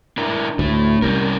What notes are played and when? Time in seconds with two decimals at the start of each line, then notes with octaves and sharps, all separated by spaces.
0.17 D4 E4 A#4
0.59 D2 A2 A3
1.02 C2 C#4 G4 A#4